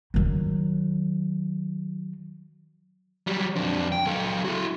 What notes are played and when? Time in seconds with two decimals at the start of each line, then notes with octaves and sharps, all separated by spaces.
0.14 D#3 F#3
3.27 F#3 G3
3.56 F2 D4
3.92 G5
4.06 F#3 A4
4.44 E4 F#4